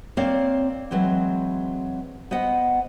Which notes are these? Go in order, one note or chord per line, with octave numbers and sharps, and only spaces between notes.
A#3 C4 C#5 D5 F5
E3 F#3 G#3 C4
B3 C5 D#5 F#5